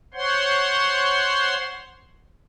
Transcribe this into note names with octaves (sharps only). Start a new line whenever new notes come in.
C5 C#5 F#5 C6